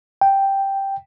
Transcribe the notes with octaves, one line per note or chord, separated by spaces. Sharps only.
G5